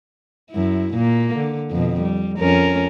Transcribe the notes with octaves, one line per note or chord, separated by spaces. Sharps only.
F#2 E4
A#2 A#3
D3
F2 B2
G3
F2 C#4 A#4